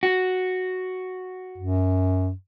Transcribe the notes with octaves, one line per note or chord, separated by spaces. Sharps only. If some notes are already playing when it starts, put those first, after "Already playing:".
F#4
F#2